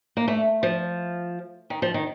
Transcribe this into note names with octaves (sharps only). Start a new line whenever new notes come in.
A#3
A3
F3
D#3
F3
D#3